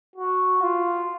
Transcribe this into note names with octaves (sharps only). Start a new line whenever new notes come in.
F#4
F4